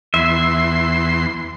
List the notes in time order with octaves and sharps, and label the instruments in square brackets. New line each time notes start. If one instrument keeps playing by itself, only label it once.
[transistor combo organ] E2 C6 [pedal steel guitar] E5